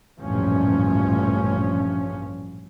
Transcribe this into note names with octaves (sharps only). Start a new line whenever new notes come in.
A1 D2 G2 A#2 F3 C#4